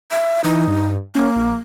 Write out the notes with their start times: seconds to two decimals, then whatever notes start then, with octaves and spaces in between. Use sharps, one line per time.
0.11 E5
0.44 E3 D#4
0.68 G2
1.15 A#3 C#4
1.36 A#1